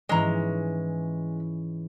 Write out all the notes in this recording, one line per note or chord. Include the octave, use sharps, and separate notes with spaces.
G#2 E3 G#3 C#4 A#5